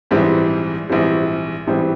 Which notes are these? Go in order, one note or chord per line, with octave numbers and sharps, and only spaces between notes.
A#1 G#2 E3 G3 C4
A#1 G#2 E3 G3 C4
A#1 G#2 E3 G3 C4